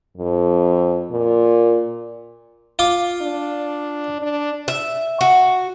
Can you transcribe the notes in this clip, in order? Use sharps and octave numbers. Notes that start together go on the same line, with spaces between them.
F2
A#2
F4 D6
D4
D4
E5
F#4